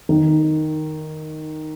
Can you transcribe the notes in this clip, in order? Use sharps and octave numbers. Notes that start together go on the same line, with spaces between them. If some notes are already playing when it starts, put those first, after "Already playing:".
D#3